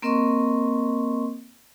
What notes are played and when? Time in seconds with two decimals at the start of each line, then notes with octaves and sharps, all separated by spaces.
0.02 A#3 C4 A#4 D#5 C6 C#6